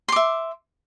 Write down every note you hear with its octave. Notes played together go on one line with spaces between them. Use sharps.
E5 C6 D6